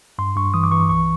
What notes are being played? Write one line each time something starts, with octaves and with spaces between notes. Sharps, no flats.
G2 C6
G2 C#6
E3 D#6
D6
E3 C#6
C2 C#6